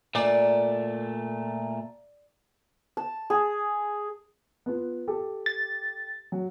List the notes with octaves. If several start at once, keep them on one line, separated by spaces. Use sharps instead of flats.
A#2 A3 D5
A5
G#4
B3 F4
G4 A4
A6
F#3